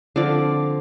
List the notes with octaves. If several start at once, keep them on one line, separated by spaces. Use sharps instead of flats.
D3 F3 C4 D5 F5